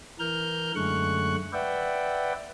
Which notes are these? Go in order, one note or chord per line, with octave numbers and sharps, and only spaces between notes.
E3 A#4 F6 G6
F#2 D3 G#3 A3 C#6 F#6
B4 D5 E5 F#5 G5